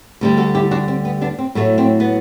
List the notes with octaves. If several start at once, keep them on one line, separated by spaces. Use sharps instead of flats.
D2 D3 G3
F#4 A4
E4 G4
D4 F#4
C4
B3
B3 D4
C4
A2 F#3 A3
C4
B3